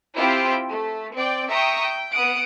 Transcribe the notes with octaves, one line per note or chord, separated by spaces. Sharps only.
C4 E4 F4 G4 G5
A3
C4 D5 G5
E5 G5 A#5 C#6 D#6
G5
B3 F#5 D#6 D7